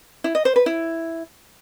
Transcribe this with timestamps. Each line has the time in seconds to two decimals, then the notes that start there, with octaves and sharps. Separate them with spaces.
0.24 E4
0.35 D#5
0.45 C5
0.56 B4
0.66 E4